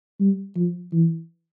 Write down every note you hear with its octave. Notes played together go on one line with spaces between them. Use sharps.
G3
F3
E3